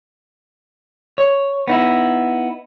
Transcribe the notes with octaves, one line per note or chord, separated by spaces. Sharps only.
C#5
B3 D#4 E4